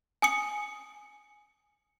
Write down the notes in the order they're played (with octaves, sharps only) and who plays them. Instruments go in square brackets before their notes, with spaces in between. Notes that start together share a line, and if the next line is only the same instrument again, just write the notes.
[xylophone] G#5 D#6 C#7